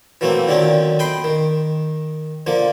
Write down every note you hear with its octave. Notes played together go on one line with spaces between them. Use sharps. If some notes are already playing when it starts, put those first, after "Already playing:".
E3 F#3 A3 A#3 C4
A#2 D3 D#3 F#3 C4 C#4
D#5 G5 B5 C6
D#3
D3 F3 A#3